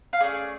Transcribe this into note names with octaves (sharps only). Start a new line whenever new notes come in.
F5
A3 C#4 G#4 D5